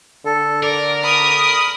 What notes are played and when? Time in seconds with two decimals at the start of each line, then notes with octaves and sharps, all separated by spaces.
0.26 D3 A4
0.63 A#4 D5
1.04 B5 D#6